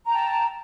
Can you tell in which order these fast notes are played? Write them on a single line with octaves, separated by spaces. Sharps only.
A#5 G5 A5